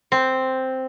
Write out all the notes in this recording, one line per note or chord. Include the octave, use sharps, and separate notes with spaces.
C4